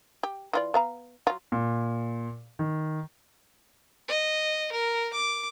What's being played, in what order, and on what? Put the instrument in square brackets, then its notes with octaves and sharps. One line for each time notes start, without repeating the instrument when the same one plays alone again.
[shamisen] G4
E3 F4 D5
B3 F5 A#5
F#3 F4
[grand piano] A#2
D#3
[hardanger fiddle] D#5
A#4
D6